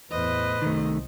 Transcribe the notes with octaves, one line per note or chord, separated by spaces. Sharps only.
E2 A2 B4 C5 D#5
C2 F#2 D#3 A3